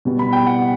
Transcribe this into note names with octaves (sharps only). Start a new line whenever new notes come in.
B2 G3 B3
B5
G5
F#5